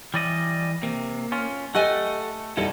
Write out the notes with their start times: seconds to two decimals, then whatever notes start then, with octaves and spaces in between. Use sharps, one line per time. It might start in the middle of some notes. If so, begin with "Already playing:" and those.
0.14 E3 G3 D5 D#5
0.83 C3 A#3
1.32 C#4 F4
1.75 A3 G4 A4 D#5 F#5 G#5
2.57 E2 B2 D3 G3 D#4 E4 A4